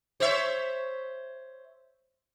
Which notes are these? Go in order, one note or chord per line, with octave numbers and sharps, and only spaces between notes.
C5 C#5 E5